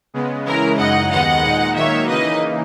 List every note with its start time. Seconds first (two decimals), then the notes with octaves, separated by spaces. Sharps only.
0.14 C#3 G#3 B3
0.46 C#3 E3 G#3 C#4 E4 A#4
0.78 F#2 C#3 G#3 D#4 D#5 F#5
1.11 D#2 D#3 G#3 B3 D#5 F#5
1.44 A#2 G#3 D#4
1.75 D#3 F#3 A#3 D#4 C#5 E5
2.08 C#3 E3 A#3 D#4 B4 D#5